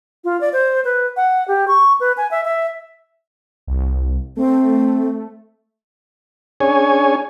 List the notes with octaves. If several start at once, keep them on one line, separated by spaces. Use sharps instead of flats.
F4
D5
C5
B4
F#5
G4
C#6
B4
G#5
E5
E5
C2
A3 C4
C#4 D4 G#4 C#5 G#5